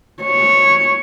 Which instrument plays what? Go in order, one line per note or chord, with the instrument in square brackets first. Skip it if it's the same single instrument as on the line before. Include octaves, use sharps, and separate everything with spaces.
[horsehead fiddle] C#5